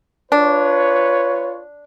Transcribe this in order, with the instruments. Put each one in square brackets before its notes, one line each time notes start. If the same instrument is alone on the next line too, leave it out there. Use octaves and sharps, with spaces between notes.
[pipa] D4 [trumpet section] F4 B4 C#5